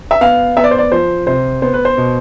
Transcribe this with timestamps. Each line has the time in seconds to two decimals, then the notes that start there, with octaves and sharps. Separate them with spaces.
0.11 E5
0.21 B3 F5
0.57 B3 E5
0.64 D5
0.71 C5
0.78 D5
0.92 F3 C5
1.27 C3 C5
1.62 B3 C5
1.74 B4
1.85 C5
1.97 B2